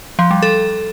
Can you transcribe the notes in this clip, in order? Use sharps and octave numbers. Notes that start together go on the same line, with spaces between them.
F3
G3
A4